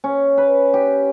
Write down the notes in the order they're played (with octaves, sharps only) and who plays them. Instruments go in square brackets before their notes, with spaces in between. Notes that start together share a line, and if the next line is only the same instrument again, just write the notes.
[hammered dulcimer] C#4
B4
G4